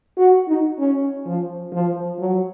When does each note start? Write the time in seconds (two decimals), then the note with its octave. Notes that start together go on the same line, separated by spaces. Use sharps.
0.18 F#4
0.48 D#4
0.79 C#4
1.26 F3
1.72 F3
2.19 F#3